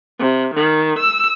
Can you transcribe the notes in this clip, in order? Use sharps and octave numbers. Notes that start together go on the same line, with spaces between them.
C3
D#3
E6